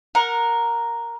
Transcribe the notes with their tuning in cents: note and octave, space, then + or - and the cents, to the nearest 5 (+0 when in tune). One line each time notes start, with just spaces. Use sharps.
A#4 +0 F#5 -15